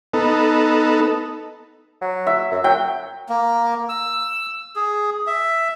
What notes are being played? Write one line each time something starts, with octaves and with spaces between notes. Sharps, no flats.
B3 D#4 A4
F#3
E5
F#2
F#3 G5
A#3
E6
G#4
E5